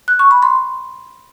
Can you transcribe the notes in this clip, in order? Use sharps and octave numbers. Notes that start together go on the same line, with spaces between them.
F#6
C#6
B5
C6